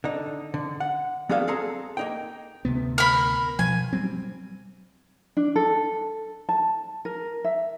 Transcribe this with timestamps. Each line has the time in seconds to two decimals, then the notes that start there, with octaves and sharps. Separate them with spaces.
0.04 D3 D#4
0.54 D3
0.80 F#5
1.29 F#3 B3 D4 G#4 A4 F5
1.48 C4 G#4 A4 A#5
1.97 A#3 D#4 G5
2.65 D2 C3 B3
2.98 A#4 B5
3.59 B2 F3 G#5
3.93 F#3 G3 C4
5.37 D4
5.56 A4
6.49 A5
7.05 A#4
7.44 E5